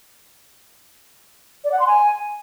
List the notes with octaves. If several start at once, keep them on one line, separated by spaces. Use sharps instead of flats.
D5
F#5
C6
G#5